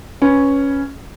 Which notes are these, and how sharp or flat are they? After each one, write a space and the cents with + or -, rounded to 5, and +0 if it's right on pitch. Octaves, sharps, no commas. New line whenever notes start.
C#4 +0 B4 +0